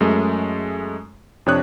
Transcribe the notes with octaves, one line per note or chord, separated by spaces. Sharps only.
F#2 G#3 A3
F2 C3 D4 C#5 D#6 F#6